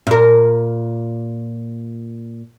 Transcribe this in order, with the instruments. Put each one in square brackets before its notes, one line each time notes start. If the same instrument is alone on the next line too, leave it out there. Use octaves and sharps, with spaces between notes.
[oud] A#2 A#4